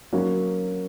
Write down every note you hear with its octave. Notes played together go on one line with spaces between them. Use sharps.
F#3 A#3 C#4 F#4